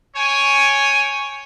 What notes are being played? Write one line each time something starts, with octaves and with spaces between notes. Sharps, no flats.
C#5 G5 G#5